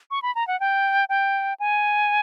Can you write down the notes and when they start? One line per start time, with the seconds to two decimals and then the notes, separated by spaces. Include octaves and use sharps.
0.11 C#6
0.22 B5
0.35 A#5
0.48 F#5
0.60 G5
1.09 G5
1.60 G#5